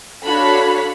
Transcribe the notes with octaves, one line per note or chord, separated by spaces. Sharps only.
D4 F#4 A4 C#5 F5 B5